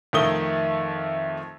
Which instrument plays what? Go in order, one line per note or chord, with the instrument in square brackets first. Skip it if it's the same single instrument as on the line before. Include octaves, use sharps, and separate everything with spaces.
[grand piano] F2 D#3 A3 D#6 G7